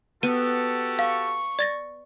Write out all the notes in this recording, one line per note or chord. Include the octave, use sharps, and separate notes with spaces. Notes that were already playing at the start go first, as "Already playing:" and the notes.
B3 F#4 G4 A4 D#7
F5 C#6
D5 A6 A#6